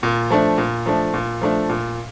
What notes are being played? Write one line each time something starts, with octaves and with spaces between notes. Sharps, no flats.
A#2
F3 A3 D4
A#2
F3 A3 D4
A#2
F3 A3 D4
A#2